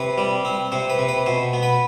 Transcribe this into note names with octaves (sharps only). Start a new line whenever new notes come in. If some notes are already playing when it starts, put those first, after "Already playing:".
Already playing: C3 B4
G3
C4
C3 C5
B4
C3
B4
B2 C5
B3
B4